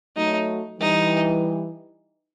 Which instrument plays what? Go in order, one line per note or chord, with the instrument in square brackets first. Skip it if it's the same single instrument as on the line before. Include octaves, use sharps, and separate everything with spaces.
[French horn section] F#3 A3 [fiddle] D#4
[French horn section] E3 G3 [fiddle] D#4